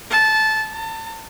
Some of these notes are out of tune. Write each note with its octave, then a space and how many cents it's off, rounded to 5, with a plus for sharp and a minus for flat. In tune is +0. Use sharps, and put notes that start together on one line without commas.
A5 -15
A5 +35